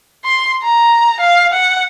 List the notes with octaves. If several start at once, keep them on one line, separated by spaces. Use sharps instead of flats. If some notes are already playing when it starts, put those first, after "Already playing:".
C6
A#5
F5
F#5